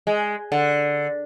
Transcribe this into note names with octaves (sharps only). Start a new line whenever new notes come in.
G#3
D3